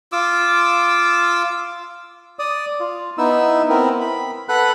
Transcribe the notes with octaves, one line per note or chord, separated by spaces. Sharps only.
F4 D6 E6
D5 D#6
F4
B3 D#4 E4 E6
B3 C4 E4 A#4
B5
A4 B4 F#5 B5 F#6